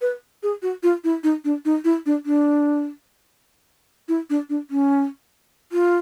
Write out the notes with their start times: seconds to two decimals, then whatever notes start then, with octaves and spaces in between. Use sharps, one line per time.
0.01 B4
0.43 G#4
0.62 F#4
0.83 F4
1.04 E4
1.24 D#4
1.45 D4
1.65 D#4
1.85 E4
2.06 D4
2.26 D4
4.08 E4
4.30 D4
4.50 D4
4.70 C#4
5.72 F4